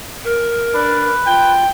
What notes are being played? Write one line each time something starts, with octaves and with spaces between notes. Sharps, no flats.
A#4
D4 B4
F4 G5